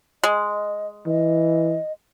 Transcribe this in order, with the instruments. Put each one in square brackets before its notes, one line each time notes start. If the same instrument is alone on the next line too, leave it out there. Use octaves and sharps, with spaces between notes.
[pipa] G#3 [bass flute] D#5
[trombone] E3 [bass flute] D#5